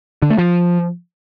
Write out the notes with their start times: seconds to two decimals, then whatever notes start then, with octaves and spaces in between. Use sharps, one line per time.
0.22 D3
0.30 A3
0.38 F3